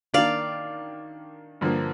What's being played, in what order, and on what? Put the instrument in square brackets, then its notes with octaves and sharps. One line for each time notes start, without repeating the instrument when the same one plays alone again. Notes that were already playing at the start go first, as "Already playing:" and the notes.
[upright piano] D#3 A#3 D4 [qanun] D5 F5
[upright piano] G2 D3 F3 A#3